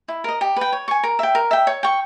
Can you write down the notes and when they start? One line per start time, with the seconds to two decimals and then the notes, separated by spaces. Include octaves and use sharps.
0.08 E4
0.24 A#4 D#5
0.41 G4
0.56 B4 G5
0.73 C#5
0.88 G#5 C#6
1.04 A#4
1.19 E5 G5
1.35 A#4
1.51 E5 G5
1.67 C#5
1.83 G5 C#6